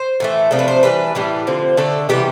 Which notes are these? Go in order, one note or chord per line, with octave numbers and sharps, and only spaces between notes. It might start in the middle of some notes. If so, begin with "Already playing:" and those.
Already playing: C5
A2 E3 A3
C3 F3 A3 D4 A4
B4
C5
E3 G3 D4 B4
A2 E3 G3 D4
D3 F3 C4
D3 A3 D4 A4
C3 E3 G3 B3 G4